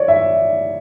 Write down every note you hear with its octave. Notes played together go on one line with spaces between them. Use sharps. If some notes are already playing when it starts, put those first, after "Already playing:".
Already playing: C#5 D5
E5